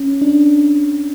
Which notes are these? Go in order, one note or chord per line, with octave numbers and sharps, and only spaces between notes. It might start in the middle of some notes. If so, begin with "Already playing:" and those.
Already playing: C#4
D4